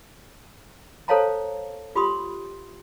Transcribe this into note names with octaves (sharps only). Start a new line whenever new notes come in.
A4 C5 C#5 F5 A5 A#5
F4 G4 B5 C6 D#6